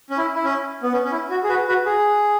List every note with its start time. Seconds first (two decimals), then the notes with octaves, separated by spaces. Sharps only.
0.10 C#4
0.18 E4
0.35 E4
0.45 C#4
0.83 B3
0.93 C#4
1.05 C#4
1.12 E4
1.30 F#4
1.44 G#4
1.49 F#4 B4
1.68 F#4 B4
1.86 G#4